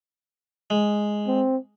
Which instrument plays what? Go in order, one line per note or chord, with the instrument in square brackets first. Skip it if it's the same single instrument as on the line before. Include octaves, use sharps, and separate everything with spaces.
[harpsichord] G#3
[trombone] C4